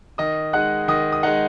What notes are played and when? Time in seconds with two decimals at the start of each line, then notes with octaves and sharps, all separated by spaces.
0.18 D#3 D#5 D#6
0.53 G#3 D#4 F#5 F#6
0.88 D#3 D#5 D#6
1.12 D#6
1.23 G#3 D#4 F#5 F#6